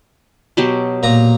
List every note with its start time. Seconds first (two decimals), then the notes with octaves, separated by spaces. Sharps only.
0.57 B2 F#3 G4
1.03 A#2 A#5